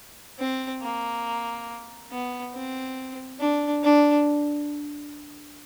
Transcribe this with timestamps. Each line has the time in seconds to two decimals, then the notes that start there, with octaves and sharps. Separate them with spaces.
0.39 C4
0.82 A#3
2.11 B3
2.54 C4
3.40 D4
3.84 D4